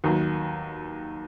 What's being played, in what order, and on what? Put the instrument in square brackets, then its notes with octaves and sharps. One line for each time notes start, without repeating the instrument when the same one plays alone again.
[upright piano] D#2 D#3 F#3